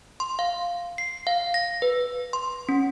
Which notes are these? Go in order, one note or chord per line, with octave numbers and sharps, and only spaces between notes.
C6
F5
C7
F5
A#6
B4
C6
C#4